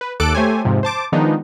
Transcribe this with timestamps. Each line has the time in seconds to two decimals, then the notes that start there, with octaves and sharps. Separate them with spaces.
0.01 B4
0.20 D#2 A4 D6 F#6 D7
0.35 A3 G4 C5 C#5 G#5
0.65 F2 G#2 C3 F3
0.83 C5 A5 D6
1.12 D#3 F3 G#3 B3 D4 D#4